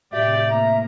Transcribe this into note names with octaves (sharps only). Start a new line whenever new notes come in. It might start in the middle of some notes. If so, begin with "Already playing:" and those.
A2 C3 G4 D5 E5
A#3 A#5